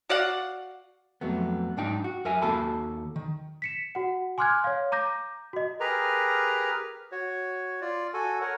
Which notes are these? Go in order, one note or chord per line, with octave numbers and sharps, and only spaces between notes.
F#4 D5 F5 F#5
F2 F#3 A3 B3
G#2 D4 D#4 G5
F#4
F#2 A#4 E5 G#5
D#2 A#3 F#4 A4 A5 B5
D#3
B6 C#7 E7
F#4 F#5
G#5 C6 D6 F6 F#6 G#6
C#5 F5
A#5 D6 G6 A#6
F#4 D#5
G4 G#4 A#4 B4 A#5 F6
F#4 C#5
F4 D5
F#4 A4 G#5
A#4 C#5 F#5